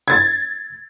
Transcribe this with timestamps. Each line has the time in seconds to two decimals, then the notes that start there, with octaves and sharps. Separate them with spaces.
0.08 G#6 A6